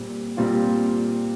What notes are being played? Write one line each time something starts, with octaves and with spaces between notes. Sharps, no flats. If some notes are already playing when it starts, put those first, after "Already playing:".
Already playing: A#2 G3 C4
A#2 G3 C4 F4